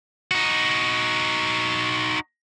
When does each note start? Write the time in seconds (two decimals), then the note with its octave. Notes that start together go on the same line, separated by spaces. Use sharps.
0.31 D#4 F#4